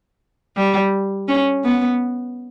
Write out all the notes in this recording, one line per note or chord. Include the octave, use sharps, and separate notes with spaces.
G3
C#4
B3